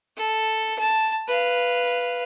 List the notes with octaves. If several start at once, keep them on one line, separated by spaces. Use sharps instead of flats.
A4
A5
B4 F5